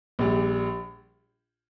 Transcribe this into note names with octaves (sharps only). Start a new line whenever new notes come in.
A#1 A#2 G3